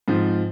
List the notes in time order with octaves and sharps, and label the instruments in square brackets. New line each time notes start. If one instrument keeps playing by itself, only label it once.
[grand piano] G#2 F3 C4